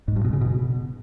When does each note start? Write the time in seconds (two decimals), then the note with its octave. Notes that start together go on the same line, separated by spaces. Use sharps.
0.08 G#2
0.16 G2
0.25 B2
0.33 C#3
0.41 B2